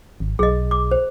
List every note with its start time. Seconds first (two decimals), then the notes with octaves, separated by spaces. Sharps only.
0.20 G#1
0.39 B1 G#4 D#5
0.71 D6
0.91 C5